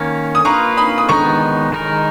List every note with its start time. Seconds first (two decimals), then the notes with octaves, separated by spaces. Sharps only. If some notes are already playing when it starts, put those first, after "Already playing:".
Already playing: D#3 A#3 C#4
0.35 D#6
0.45 A#3 F4 B4 A#5 C#6
0.77 B5 D#6
0.98 D#6
1.09 D#3 G#3 B3 D#4 A#5 C#6
1.72 D#3 G#3 D#4 A#4